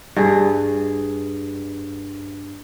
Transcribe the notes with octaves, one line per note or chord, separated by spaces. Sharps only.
G2 G#4